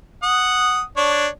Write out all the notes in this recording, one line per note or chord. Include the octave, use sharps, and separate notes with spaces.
F#5 D#6
D4 C#5